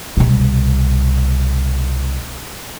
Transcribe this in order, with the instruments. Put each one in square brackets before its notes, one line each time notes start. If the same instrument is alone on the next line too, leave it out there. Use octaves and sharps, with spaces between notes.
[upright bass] C2 B2